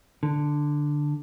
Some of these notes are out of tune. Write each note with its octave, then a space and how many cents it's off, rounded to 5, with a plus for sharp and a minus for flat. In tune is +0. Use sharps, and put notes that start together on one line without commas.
D3 +5